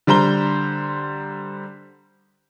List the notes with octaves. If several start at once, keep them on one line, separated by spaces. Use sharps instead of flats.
D3 G3 C5 A#5 G7